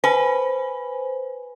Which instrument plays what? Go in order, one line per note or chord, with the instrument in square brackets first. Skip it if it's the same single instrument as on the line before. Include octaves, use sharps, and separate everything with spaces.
[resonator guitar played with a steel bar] B4 [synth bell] C5 G#5